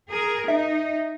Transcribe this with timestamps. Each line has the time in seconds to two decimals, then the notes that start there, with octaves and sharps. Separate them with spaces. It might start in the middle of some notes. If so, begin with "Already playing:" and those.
0.10 G#4 A#4
0.48 D#4 E5